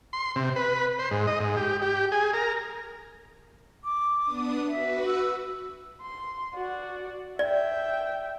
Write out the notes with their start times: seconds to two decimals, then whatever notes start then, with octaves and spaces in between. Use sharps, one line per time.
0.13 C6
0.36 C3
0.56 B4
0.99 C5
1.11 G#2
1.27 D#5
1.40 G#2
1.57 G4
1.82 G4
2.12 G#4
2.34 A#4
3.84 D6
4.23 B3 D4 D#6
4.68 F#4 B4 E5
5.06 E6
6.02 C6
6.54 F#4 D5
7.39 D5 E5 G5